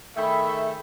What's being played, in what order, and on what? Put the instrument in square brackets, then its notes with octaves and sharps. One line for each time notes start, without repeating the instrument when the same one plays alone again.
[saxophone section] D#3 A3 [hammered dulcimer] G#4 G5 B5 [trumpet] E5